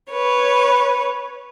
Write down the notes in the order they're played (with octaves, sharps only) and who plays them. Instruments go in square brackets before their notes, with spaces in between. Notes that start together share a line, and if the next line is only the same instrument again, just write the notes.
[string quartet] B4 C#5